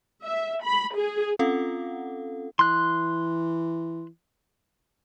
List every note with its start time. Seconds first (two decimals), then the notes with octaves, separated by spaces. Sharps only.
0.24 E5
0.62 B5
0.96 G#4
1.39 C4 C#4 F4 A4 F5 F#5
2.59 E3 C6 F#6